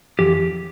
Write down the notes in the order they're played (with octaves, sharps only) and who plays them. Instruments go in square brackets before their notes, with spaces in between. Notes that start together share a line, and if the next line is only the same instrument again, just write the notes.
[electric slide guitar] F2 E3 G4